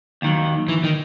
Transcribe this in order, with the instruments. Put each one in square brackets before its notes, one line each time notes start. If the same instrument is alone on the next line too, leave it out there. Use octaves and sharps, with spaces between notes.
[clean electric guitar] D#2 D#3 F#3
[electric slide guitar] E3
D#3